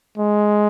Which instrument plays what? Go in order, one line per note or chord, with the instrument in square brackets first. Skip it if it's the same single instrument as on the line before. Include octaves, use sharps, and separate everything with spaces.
[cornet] G#3